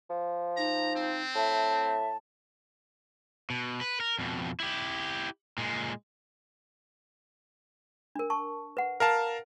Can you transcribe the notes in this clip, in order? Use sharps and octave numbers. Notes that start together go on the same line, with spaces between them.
F3
D#4 A#5
C4
A2 E5 A5
B2
B4
A#4
F2 B2
E4 G4
A#2 G#3
D4 A#4
A5 C#6
B4 F#5
A#4 F5 A5